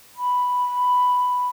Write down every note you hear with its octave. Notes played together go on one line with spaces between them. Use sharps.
B5